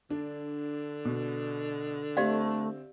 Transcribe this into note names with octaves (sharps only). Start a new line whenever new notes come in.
D3 D4
B2
A3 C4 G4 D5 E5 F5